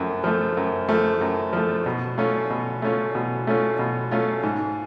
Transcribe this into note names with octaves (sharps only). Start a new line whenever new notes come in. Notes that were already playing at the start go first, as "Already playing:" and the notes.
Already playing: F#2 F3 A3
F3 A3
F#2
F3 A3
F#2
F3 A3
B2
A3 C#4 F4
B2
A3 C#4 F4
B2
A3 C#4 F4
B2
A3 C#4 F4
G#2